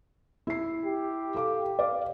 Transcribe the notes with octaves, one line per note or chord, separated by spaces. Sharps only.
E4 C7
G4
A4 F5 D6
D5 F5 D6